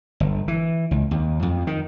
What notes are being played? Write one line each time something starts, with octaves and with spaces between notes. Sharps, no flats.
G1
E3
C#2
D#2
F2
D#3